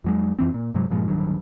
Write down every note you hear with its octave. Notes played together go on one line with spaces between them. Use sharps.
F2 F#3 G#3
F2 E3 C4
A#2
G2 C3 F#3 G#3
G2 A#2 F3 G#3
D1 G2 D#3 F#3